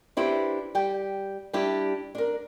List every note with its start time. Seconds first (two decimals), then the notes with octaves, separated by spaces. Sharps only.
0.17 D4 E4 G4 B4 C5
0.75 G3 G4 G5
1.53 G3 D4 E4 G4
2.15 D4 A#4